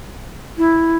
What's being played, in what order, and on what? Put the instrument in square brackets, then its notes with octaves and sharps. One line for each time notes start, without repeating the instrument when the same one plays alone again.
[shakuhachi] E4